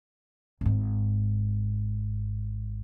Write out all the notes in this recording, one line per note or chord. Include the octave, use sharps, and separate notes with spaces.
G#1 G#2